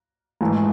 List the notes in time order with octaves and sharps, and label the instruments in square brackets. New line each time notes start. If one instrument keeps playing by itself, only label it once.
[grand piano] G#2 E3 A3